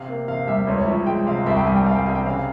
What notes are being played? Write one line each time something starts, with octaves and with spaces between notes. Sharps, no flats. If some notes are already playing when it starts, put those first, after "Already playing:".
Already playing: C3 F5
A#3
C3 F5
G3 E5
C#2 C#5
C#5
F3 E5
G#3 G5
C3 F5
C2 E5
G5
G3 G#5
G5
C2 F5
G5
C3 G#5
G5
C#3 F5